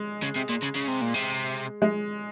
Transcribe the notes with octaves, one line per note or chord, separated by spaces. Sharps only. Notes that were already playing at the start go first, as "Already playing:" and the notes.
Already playing: G#3
C#3
C3
A#2
C#3
C#3
C3
A#2
C3
G#3